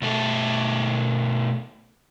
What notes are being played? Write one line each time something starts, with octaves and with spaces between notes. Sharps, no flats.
B2 A3 A4